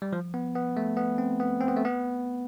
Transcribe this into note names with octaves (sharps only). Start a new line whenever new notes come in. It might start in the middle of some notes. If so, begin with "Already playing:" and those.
G3
F3
B3
B3
A3
B3
C4
B3
C4
B3
A3
B3